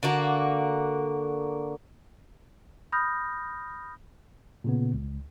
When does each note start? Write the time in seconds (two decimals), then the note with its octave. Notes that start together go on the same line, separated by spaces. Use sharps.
0.03 D3 A#3 F#4
2.92 B5 D#6 F6 G6 A#6
4.64 A#2 C#3 B3
4.94 C#2